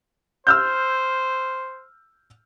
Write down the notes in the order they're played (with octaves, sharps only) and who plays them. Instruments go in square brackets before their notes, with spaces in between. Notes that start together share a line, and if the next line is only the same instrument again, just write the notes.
[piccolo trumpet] C5 [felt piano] E6 F6 G6